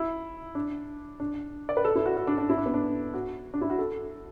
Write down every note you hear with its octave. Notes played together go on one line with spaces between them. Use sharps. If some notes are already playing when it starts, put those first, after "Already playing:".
Already playing: E4
D4
D4
D5
B4
A4
E4
F#4
F#4
D4
D4
E4
D4
B3
D4
F#4
D4
E4
F#4
A4